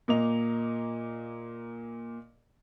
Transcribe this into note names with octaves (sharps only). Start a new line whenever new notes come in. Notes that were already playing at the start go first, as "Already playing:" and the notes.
A#2 A#3 D#5 F7